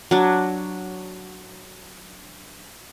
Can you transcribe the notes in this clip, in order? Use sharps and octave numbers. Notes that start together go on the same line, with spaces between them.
F#3 D4